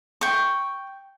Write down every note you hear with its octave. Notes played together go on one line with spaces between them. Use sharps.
G5 C#6